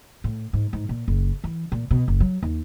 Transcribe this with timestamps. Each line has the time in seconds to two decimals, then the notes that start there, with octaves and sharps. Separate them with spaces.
0.24 A2
0.53 G#2
0.73 G#2
0.89 A#2
1.08 F#1
1.44 E3
1.72 A#2
1.91 B2
2.08 F#1
2.20 F#3
2.43 D#2